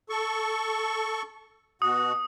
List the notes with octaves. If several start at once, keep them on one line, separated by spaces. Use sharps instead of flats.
A4 C#6
B2 F#4 D#6